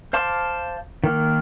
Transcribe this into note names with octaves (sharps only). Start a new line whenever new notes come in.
C5 F5 A5 C6 D6
D#3 A#3